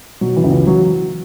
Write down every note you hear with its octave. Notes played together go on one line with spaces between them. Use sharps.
B2 F#3
E3
C#2
E3
F#3